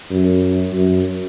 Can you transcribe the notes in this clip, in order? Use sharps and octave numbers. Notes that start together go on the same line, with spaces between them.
F#2
F#2